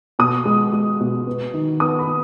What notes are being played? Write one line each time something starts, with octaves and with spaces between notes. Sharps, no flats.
B2 D#6
G#3
G#3
B2
B3
D#3
B3 D#6
B5
B3